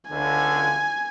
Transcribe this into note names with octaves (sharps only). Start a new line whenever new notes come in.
C#2 D3 G#5